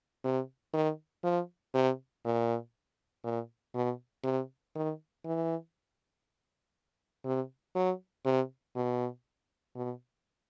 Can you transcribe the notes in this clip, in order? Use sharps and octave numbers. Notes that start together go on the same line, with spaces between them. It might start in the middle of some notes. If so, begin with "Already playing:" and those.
C3
D#3
F3
C3
A#2
A#2
B2
C3
D#3
E3
C3
F#3
C3
B2
B2